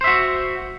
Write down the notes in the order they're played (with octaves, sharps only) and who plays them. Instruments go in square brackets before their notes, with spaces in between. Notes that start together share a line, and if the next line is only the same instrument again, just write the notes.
[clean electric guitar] C5
E5
F#4